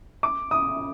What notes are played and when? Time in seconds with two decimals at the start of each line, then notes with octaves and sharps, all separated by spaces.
0.23 D6
0.51 D#6